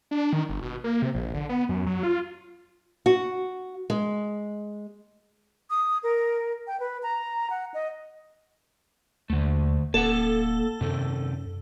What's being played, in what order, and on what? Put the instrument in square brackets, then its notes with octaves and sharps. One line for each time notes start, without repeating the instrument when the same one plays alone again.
[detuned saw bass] D4
D#3
G1
B2
A#3
C3
A#1
D3
B3
F#2
F#3
F4
[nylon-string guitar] F#4
G#3
[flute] D#6
A#4
G5
B4
A#5
F#5
D#5
[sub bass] D#2 [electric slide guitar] D3 A3
[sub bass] D1 [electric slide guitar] A#3 F#5 [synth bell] A4
[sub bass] F#2 [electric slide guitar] C3 D#3